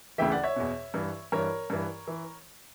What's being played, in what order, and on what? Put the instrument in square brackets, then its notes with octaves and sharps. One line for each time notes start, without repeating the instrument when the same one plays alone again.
[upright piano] D2 C#3 E3 E5 G5
D5 F#5
C#5 E5
E2 B2
G2 E3
G2 E3 A#4 C#5
G2 E3
E3